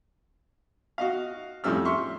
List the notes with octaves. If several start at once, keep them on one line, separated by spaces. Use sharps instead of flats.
F#4 D#5 F5
F2 A2 G3 C#4 E6 F6
E5 C6 C#6